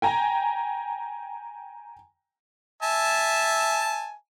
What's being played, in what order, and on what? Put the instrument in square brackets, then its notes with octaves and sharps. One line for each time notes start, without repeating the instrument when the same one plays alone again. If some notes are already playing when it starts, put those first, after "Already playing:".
[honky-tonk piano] G5 G#5 A#5
[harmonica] E5 G#5 A5